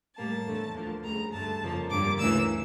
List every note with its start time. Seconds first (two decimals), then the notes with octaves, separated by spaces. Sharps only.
0.16 A2 G3 A#3 A5
0.46 E2 D3 A3
0.74 D2 D3 F3 A#3
1.03 D2 C#3 G3 A#5
1.32 G2 D3 A3 A5
1.61 F2 C#3 F3 A#3
1.90 G2 D3 G3 A#3 D6
2.19 D2 C#3 E3 A#3 E6